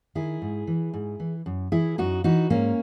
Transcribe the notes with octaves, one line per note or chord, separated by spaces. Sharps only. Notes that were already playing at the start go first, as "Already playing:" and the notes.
D#3 E4 G#4
G#2
E3
G#2
E3
F#2
E3 E4 G#4
F#2 D#4 F#4
E3 D#4 F#4
G#2 A#3 C#4